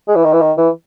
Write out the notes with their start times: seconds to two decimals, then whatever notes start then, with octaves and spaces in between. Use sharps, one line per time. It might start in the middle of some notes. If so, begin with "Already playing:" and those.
0.08 G#3
0.16 E3
0.24 D#3
0.33 E3
0.41 D#3
0.57 E3